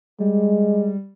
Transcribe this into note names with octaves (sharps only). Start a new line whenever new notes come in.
G3 G#3